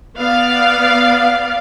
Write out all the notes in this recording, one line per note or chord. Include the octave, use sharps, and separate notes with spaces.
B3 D5 F5